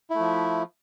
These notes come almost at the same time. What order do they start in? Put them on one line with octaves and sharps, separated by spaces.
E4 A3 F3